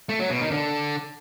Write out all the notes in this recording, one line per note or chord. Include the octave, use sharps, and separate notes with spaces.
A3
F#3
B2
D#3
D3